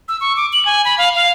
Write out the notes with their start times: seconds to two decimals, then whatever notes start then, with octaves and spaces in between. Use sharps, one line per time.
0.08 E6
0.21 C#6
0.36 D6
0.53 F#7
0.65 G#5
0.85 B5
0.98 F5
1.15 F5